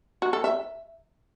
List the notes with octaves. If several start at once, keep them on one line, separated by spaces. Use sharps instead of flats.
F#4
A4
E5